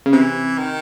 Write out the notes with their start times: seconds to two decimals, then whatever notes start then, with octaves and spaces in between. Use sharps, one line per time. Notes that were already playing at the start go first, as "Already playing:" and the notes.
0.06 C#3
0.13 C3 E3
0.58 D#3